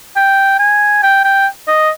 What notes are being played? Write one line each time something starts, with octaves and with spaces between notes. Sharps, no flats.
G5
G#5
G5
G5
D#5